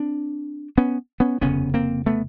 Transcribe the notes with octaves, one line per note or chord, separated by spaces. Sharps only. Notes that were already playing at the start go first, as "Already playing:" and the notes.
Already playing: C4 D4
B3 C#4
B3 C#4
F1 D#2 C#3 B3 C#4
A#3 C4
A3 B3